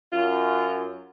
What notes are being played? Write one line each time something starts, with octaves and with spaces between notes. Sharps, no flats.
F#2 F4